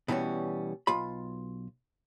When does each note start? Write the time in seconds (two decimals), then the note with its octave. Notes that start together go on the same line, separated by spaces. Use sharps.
0.08 B2 E3 G3 C4 C#4
0.87 B1 F4 B5